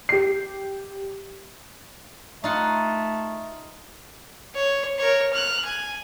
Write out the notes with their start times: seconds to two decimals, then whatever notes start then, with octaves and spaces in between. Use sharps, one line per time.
0.09 G4 C7
2.44 A3 D#4 F4 F#5
4.55 C#5
4.98 A#4 C#5
5.33 F6 F#6
5.65 G#5